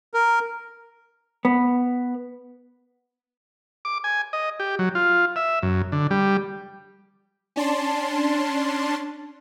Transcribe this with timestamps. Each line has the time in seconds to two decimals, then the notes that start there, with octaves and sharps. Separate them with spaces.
0.14 A#4
1.45 B3
3.85 D6
4.04 G#5
4.33 D#5
4.60 G4
4.79 F#3
4.95 F4
5.36 E5
5.62 F#2
5.92 D3
6.11 G3
7.56 C#4 D4 A5 C6